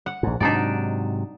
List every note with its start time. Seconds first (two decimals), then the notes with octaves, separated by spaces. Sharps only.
0.06 F#5
0.23 A#1 G#2
0.40 G#2 C3 F#3 D4 D#4 D5